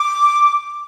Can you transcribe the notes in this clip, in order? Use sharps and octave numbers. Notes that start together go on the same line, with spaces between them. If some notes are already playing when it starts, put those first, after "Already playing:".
Already playing: D6